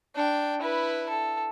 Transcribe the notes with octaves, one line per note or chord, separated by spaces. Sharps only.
D4 G5
E4 B4
A4